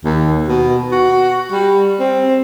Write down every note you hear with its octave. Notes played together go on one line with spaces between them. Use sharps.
D#2
B2
F#4
G3
C4